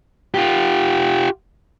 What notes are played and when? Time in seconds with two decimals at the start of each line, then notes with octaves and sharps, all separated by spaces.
0.34 F4 G4